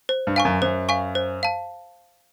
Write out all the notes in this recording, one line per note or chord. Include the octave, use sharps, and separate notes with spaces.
C5
G2
F5 G#5 C#6
F#2
F#2 C5
F5 G#5 C#6
C5
F5 A5